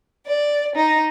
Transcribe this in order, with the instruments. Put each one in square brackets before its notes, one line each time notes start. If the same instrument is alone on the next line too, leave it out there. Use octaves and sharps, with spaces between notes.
[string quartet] D5
D#4